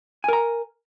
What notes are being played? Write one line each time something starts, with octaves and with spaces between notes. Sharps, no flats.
A#4 G#5 A#5